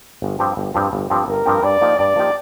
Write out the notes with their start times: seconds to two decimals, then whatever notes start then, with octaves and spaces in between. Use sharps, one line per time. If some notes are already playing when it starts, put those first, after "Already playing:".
0.22 G1
0.39 G2 F3 C4 G4
0.57 G1
0.74 G2 F3 C4 G4
0.93 G1
1.10 G2 F3 C4 G4
1.28 G1 A#4
1.45 G2 F3 C4 G4
1.63 G2 D5
1.81 F3 A#3 D#4 G4
1.98 G2 D5
2.16 F3 A#3 D#4 G4